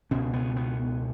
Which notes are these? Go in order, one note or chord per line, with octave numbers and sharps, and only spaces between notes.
C#2 B2 C#4
B3
B3